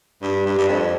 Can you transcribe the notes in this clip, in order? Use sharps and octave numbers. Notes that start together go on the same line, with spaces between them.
G2
G2
G2
F2